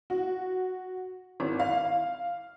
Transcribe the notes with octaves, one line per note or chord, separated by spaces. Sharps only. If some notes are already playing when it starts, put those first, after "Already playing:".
F#4
G#1
F5